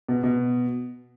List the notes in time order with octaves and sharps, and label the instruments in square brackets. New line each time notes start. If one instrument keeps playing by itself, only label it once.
[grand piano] B2
B2